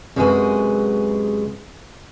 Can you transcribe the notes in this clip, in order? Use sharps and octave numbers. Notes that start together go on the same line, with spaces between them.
F#2 C3 G#3 F#4 G#4 B4